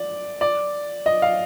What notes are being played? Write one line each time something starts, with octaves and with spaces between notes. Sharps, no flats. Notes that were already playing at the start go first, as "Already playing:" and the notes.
Already playing: D5
D5
D#5
F5